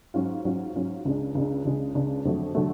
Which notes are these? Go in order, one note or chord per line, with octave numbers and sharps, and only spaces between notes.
G#2 F#3 C#4 F4
G#2 F#3 C#4 F4
G#2 F#3 C#4 F4
C#2 C#3 G#3 D4
C#2 C#3 G#3 D4
C#2 C#3 G#3 D4
C#2 C#3 G#3 D4
F2 D3 F#3 A3
D3 F#3 A3